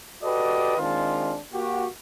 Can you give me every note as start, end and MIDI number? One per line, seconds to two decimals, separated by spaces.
0.23 0.78 66
0.23 0.78 67
0.23 0.78 69
0.23 0.78 71
0.23 0.78 74
0.23 0.78 75
0.78 1.36 51
0.78 1.36 56
0.78 1.36 60
0.78 1.36 62
0.78 1.36 65
1.52 1.86 58
1.52 1.86 66
1.52 1.86 67